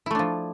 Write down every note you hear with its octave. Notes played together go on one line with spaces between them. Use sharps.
F3 A3 D4 E4